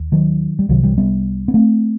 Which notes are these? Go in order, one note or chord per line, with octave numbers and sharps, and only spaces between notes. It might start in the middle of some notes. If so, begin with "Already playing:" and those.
Already playing: D#2
D#3 F#3
G3
C2 C3 D#3 F#3
E3 G3
G3 B3
B3
A3 C4